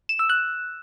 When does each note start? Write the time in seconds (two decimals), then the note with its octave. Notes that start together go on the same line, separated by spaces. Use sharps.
0.09 E7
0.19 E6
0.30 F#6